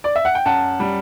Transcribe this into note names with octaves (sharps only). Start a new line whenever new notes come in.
D5
E5
F#5
G5
F#2 F#5 A5
G3